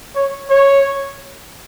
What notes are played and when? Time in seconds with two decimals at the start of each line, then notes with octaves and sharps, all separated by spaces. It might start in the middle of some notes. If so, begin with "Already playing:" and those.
0.15 C#5
0.50 C#5